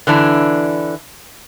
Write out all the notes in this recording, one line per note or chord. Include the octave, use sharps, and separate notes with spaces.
D3 E3 D4 E4